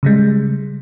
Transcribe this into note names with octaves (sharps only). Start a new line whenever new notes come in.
C#3 G3 G#3